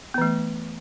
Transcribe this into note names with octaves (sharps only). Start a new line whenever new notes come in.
E3 A3 B3